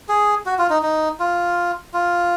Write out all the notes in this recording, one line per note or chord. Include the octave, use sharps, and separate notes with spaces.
G#4
F#4
F4
D#4
D#4
F4
F4